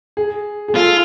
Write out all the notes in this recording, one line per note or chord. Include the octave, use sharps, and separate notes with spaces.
G#4
G#4
F4 A4